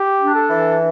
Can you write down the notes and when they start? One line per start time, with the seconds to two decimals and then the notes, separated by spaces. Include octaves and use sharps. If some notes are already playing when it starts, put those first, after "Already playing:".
Already playing: G4
0.21 D4
0.35 A4
0.49 E3